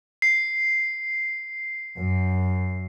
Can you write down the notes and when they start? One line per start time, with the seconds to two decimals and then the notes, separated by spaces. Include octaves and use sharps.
0.22 C7
1.98 F#2